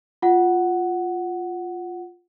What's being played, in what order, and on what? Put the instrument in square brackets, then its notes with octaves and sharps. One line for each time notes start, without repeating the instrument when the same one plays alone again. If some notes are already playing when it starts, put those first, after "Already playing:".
[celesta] F4 F#5